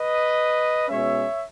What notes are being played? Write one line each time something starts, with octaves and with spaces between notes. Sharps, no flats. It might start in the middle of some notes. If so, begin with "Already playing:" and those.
Already playing: B4 D#5
B2 G#3 C#4 C#5 E5